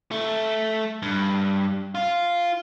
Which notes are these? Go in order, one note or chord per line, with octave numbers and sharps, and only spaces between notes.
A3
G2
F4